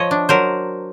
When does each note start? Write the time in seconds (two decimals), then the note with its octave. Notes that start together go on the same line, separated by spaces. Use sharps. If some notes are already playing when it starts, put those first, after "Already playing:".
Already playing: F3 C#5 D#5
0.11 D4
0.29 F#3 A#4 C5